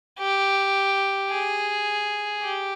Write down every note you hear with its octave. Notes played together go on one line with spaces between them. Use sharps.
G4
G#4
G4